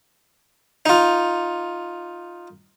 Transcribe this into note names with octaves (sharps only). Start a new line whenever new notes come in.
D#4 F4